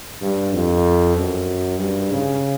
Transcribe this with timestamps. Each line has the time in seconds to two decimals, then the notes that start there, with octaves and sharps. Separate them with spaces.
0.21 G2
0.53 F2
1.16 F#2
1.79 G2
2.11 C#3